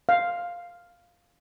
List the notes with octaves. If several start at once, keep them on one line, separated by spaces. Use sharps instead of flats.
F5